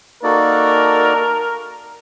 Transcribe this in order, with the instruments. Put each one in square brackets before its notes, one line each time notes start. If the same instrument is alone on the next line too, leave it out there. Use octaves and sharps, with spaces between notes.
[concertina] A#3 D#4 F#4 A4 D5 [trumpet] A#4